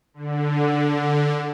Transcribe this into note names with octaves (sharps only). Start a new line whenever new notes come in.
D3